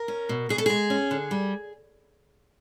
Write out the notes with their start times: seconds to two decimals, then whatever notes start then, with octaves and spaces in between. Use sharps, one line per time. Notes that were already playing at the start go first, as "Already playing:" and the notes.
Already playing: A#4
0.08 C#4
0.29 B2
0.49 B2 G#4
0.58 A4
0.66 G#3 G#4
0.90 C#4
1.11 D3
1.31 G3